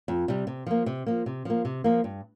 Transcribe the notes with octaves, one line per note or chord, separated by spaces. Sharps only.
F2
C3 G3
C3
F3 A#3
C3
F3 A#3
C3
F3 A#3
C3
F3 A#3
G2